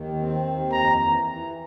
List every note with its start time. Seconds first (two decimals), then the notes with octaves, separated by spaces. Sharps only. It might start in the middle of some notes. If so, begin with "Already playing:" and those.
Already playing: D#2 D#3
0.19 C4
0.45 D#2
0.72 F2 A#5
1.00 E3
1.26 E3